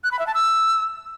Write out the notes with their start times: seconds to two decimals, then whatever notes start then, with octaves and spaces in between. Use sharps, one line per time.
0.04 F#6
0.11 B5
0.19 E5
0.27 A5
0.35 E6